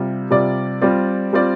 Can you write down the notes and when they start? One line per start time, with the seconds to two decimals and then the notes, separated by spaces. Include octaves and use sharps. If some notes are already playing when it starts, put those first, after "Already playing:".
Already playing: C3 G3 F4
0.31 C3 G3 F4 D5
0.81 G3 C4 F4 D5
1.33 G3 C4 F4 D5